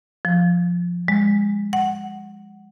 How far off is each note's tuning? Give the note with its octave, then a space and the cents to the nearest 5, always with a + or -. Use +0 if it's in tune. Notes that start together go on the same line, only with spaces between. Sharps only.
F3 +5
G#3 -25
F#5 +5